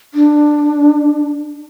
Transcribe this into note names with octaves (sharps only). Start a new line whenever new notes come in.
D4